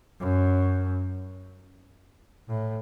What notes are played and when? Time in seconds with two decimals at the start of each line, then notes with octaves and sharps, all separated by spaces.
0.20 F#2
2.48 A2